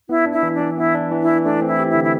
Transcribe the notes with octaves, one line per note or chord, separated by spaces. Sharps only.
B3 E4
D4
E4
E3
D4
E3
B3 E4
D4
E3
E4
E3
A3 D4
C4
E4
G4
E4
D3
E4